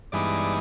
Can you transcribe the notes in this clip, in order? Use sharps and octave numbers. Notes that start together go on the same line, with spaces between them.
G2 E3 G#3 B3 D#4 D5